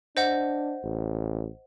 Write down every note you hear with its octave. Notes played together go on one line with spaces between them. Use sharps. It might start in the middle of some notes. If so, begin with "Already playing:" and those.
D4 C5 D#5 F#5
A1